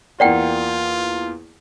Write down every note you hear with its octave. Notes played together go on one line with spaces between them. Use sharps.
E2 A#3 F4 D5 F#5 G5